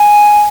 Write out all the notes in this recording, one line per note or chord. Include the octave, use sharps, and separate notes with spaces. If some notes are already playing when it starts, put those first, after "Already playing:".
Already playing: G#5